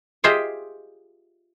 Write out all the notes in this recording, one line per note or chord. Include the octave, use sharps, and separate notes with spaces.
F4 G4 G#4 C5 D#5 E5